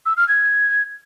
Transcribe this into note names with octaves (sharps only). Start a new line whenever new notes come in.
E6
F6
G#6